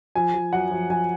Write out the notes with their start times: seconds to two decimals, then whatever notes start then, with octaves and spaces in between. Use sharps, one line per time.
0.15 F3 G#5
0.34 F3
0.53 F#2 F#5
0.71 F3
0.90 F3 G#5